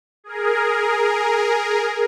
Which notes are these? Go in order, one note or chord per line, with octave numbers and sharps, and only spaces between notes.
G#4 A#4